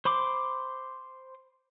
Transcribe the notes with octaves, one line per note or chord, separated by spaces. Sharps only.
C5 B5 C6 D6